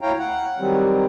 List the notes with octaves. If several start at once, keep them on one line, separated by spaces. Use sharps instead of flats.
D2 E4 C#5 F5 G5 A#5
F#5
D#3 F#3 G3 C4